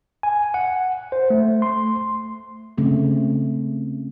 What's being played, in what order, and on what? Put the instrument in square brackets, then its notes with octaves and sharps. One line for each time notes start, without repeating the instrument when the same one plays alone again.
[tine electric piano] G#5
F#5
C5
A3
C6
[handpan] C#3 A3 C4